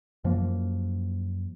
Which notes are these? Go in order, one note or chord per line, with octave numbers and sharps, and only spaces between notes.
F#2 F3 A#3